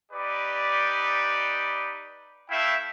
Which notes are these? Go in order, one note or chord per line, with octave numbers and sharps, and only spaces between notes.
D#4 G4 B4 D5
A3 E4 E5 F5 G5